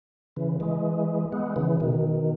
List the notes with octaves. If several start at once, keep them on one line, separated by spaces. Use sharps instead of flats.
C#3 E3
E3 G#3
G#3 B3
C#3 E3
B2 D#3